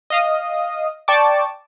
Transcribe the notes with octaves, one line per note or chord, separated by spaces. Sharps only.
D#5 F5 D#6
D5 G5 A5 C#6 D6